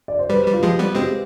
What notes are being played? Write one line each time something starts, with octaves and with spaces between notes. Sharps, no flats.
D5
C5
G3 B4
G3
F4
F3 G#3 G4
G3 B3
G#3 C4 G4